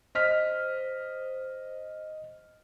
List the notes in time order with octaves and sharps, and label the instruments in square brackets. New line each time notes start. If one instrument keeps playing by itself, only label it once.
[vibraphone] C5 [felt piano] D#5 F6 B6